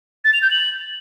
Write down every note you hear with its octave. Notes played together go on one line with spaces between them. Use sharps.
A6
F7
G6
F#7